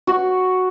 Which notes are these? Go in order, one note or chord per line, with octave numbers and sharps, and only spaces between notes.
F#4